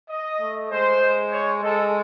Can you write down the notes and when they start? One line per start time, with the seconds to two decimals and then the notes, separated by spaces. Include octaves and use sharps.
0.10 D#5
0.41 A3
0.71 G#3 C5
1.01 G#3
1.32 C#5
1.62 G#3 A4